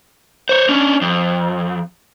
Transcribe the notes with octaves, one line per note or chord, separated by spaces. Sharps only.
C5 C#5
C#4 D4
F2